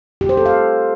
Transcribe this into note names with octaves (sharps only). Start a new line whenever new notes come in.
G4
C5
A4
F5